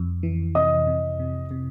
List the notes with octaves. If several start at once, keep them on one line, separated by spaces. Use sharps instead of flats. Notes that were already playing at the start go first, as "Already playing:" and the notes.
Already playing: F2
E3
C3 D#5 D#6
C3
C3
C3